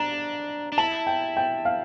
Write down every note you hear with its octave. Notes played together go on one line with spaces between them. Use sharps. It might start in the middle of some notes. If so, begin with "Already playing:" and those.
Already playing: D4 A#5
D4
E4 A5
G5
G5
F5